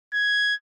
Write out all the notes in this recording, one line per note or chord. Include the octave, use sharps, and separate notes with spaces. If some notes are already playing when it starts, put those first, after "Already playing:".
G#6